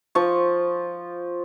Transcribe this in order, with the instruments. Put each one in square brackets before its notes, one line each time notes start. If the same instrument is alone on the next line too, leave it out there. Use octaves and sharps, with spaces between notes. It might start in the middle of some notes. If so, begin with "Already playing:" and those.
[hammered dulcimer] F3 C#6